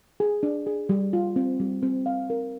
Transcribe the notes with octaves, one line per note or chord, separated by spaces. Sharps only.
G#4
D4
G#4
G3
F4
C4
G3
C4
F5
A#4